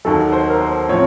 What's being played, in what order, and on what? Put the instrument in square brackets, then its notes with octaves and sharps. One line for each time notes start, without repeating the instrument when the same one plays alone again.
[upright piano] D#2 D#3 F#3 [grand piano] A4
[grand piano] C5
A#4
C5
[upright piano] A2 F3 C4 [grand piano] C#5